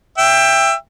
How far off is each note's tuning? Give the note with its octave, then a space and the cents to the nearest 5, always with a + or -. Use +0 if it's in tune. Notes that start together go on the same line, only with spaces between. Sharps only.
E5 +15 G5 +20